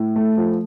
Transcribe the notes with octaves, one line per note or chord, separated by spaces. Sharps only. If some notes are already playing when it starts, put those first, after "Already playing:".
Already playing: A2
A3
F3